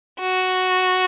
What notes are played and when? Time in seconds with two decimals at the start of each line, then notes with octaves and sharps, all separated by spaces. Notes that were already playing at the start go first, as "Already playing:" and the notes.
0.19 F#4